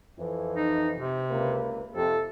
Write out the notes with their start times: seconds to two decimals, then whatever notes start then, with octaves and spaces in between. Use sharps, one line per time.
0.19 F2 E3
0.56 D#4
0.94 C3
1.30 C#2 A#3 B4
1.94 F2 C3 A4